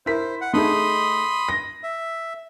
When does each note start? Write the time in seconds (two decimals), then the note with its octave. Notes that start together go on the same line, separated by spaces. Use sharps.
0.06 E4 A#4 C5 B6
0.41 F#5
0.54 A3 D#4 G#4 B5 C6 D#6
1.49 A#6
1.83 E5